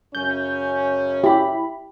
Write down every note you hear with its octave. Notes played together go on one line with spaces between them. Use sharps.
F#2 C#3 C#4 G6
E4 G4 B5